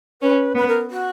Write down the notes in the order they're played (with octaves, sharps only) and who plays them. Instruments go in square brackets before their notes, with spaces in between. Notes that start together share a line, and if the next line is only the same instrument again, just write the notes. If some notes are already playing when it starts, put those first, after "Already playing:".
[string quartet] C#4 [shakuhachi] B4
[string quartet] B3 [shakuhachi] B4
[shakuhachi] A#4
F#4